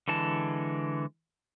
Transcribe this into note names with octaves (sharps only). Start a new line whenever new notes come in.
D3 E3 G#3 A5